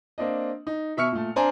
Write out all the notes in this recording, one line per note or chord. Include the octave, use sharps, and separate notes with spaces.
A#3 C4 D4 D#5
D#4
B2 E5 C#6 F6 C#7
A#2 A3
C4 D4 C5 G#5 A#5